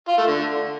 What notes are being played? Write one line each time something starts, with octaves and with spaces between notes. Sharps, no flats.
F4
A3
D3